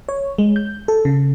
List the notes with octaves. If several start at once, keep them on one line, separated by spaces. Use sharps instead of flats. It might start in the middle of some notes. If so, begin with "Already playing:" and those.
C#5
G#3
G6
A4
C#3